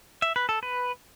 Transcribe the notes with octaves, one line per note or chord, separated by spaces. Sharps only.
E5
B4
A4
B4